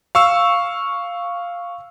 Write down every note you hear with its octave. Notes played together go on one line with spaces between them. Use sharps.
F5 C#6 E6